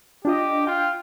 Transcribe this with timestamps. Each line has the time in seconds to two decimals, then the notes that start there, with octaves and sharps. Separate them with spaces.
0.25 D4 F4 G4 D#5
0.67 F4 G5